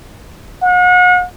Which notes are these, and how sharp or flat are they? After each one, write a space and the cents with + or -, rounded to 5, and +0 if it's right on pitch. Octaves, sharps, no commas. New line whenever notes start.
F#5 -40